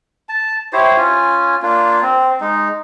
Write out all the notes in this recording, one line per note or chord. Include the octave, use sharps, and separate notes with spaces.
A5
E4 G4 C5 C#5
C#4 F4 G#5
A#3 D4 F4
C4
G#3 D#4